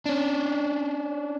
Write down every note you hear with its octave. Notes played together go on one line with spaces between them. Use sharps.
C#4 D4